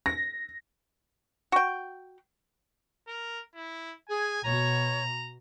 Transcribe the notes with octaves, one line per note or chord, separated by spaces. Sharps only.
A#6
F#4 G5
A#4
E4
G#4 G#5
B2 C#5 A#5